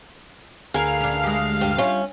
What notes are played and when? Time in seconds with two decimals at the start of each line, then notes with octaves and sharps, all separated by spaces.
0.74 D2 G#4 A#4 B4 F5 F6
1.00 C#4 D4
1.24 G#3 G4
1.61 G2
1.78 G3 C#4 F4